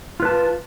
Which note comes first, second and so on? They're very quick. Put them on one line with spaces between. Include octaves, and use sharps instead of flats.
F4 B4 A5